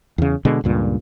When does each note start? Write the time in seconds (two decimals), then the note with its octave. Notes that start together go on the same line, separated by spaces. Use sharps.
0.18 E2 C#3
0.45 B2 D3 G#3
0.64 C#2 G2 A#2